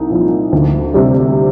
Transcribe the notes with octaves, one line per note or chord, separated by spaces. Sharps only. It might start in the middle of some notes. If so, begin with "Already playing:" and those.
Already playing: C2 D#4
A#2 F3
D2
C3 G3